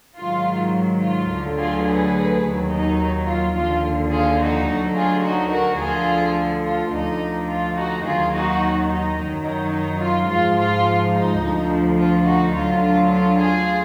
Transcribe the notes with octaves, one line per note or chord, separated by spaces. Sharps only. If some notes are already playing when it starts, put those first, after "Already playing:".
G#2 D#3 F#3 F4
F4
D2 D3 F#3
F4 G#4
G#4 B4
D#2 D#3 F#3
D#4
F4
D#2 D3 F3 F4
F4 G#4
D#4 F#4
D2 D3 F#3
F4 G#4
D#4 F#4
F#4 A#4
D2 D3 F3 F4 G#4
F4
D2 D3 F3 D#4
F4
D#4 F#4
D#2 D#3 F#3 F4 G#4
D#4 F#4
D#4
F#2 D#3 F#3
D#4
D#4
F4
G#2 F3 F4
F4
D#4
D2 D3 F3
F4
D#4 F#4
D2 D3 F#3 F4
F4
F4
F4 G#4